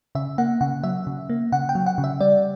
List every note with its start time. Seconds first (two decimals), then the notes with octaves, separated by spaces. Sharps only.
0.15 C#3 E5
0.38 A#3 F#5
0.61 C#3 F#5
0.84 F#3 E5
1.07 C#3
1.30 A#3
1.52 C#3 F#5
1.69 G5
1.75 F#3
1.86 F#5
1.98 C#3
2.04 E5
2.21 G3 D5